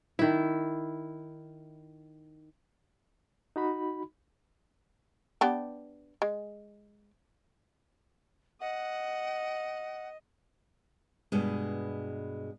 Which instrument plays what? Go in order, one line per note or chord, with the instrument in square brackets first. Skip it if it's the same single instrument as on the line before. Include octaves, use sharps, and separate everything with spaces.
[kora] D#3 E4
[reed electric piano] D#4 F#4 B5
[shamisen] B3 D4 G4
G#3
[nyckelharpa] D#5 [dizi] F#5
[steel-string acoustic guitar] G2 B2 G#3